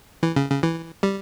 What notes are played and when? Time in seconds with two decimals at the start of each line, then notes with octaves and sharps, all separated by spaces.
0.23 E3
0.36 C#3
0.50 C#3
0.63 E3
1.03 G3